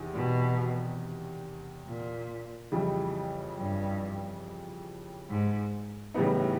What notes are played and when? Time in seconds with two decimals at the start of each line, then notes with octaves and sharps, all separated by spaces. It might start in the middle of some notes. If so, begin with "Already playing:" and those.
Already playing: E2 C3 D#3
0.14 B2
1.86 A#2
2.72 F2 C#3 E3 G3
3.57 G2
5.29 G#2
6.14 A2 C#3 E3 G3 B3 D#4